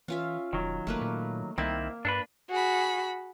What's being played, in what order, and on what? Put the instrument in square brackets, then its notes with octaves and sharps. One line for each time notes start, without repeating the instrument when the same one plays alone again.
[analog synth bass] E3 [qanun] C#4 F4 E5
[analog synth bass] E1 [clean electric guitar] D#3 F#3
[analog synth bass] G1 [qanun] A3 A#3 B4
[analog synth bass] A#2
[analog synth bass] C2 [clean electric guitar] D#3 C4 E4 [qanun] A#3
[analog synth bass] G2 [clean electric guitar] D4 A4 B4
[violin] F#4 [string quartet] G#4 B5